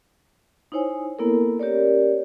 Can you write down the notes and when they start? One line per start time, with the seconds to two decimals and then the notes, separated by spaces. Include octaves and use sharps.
0.72 D#4 E4 C5 C#5 G#5
1.19 A#3 B3 E4 A4 A#4
1.59 C#4 G4 A#4 C#5 D5